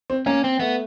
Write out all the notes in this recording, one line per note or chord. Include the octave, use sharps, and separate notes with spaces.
C4
A#3 C#4
C4
A3 B3